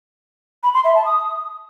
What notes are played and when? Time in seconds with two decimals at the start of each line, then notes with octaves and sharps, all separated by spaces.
0.63 B5
0.74 C6
0.84 E5
0.95 A5
1.05 D#6